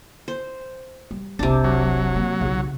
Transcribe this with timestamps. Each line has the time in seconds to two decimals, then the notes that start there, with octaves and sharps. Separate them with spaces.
0.28 C5
1.11 G3
1.39 F1 C2 C3 D4
1.64 F#3
2.16 A#3
2.41 B1 C#3 F4